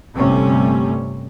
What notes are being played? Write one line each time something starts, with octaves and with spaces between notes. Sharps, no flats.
G1 C3 G3 A3 C#4